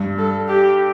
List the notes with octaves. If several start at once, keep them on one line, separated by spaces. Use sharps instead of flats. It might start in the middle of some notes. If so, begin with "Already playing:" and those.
Already playing: G2
A4
G4